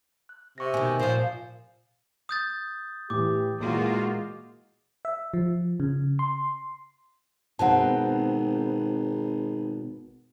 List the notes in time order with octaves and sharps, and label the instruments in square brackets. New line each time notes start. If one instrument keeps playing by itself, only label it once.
[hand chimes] F#6
[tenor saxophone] C3 [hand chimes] E5 C#6 A#6
[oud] B2 D#3 [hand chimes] G#5
[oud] A#2 F3 [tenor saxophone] C5
[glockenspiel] D#6 G6 A6
[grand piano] A2 E3 [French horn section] G4 [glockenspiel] D6
[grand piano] A#2 E3 [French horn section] G#3 [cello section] A#3 F4 F#4
[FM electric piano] E5
F3
C#3
C6
[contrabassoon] G#1 [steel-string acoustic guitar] B2 B3 C4 [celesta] F#5 A5